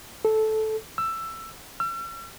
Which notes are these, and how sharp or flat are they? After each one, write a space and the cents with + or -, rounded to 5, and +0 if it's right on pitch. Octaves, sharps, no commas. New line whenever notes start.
A4 -10
E6 +15
E6 +45